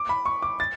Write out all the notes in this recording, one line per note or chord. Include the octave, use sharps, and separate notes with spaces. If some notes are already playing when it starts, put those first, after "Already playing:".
Already playing: D6
B5
C#6
D6
A6